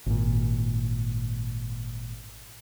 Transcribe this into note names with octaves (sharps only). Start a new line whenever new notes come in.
G#1 A#2